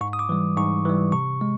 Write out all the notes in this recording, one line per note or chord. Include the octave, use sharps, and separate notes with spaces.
G#2 C#6
D#6
D6
E3 G3
G#2 C#6
E3 G3
C3 C#6
G#3